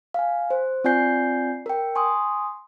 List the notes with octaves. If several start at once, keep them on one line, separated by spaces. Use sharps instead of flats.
F5 G#5
C5
C4 F4 D5 G#5 G6 C7
A#4 G5
G#5 C6 C#6 D#6